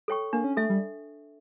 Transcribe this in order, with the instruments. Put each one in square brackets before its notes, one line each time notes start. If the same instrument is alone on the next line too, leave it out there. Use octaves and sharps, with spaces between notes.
[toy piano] A4 C#5 G5 C#6
[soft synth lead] A#3 [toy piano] D4
[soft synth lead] C#4
[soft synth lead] A3 [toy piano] A4 E5
[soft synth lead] G3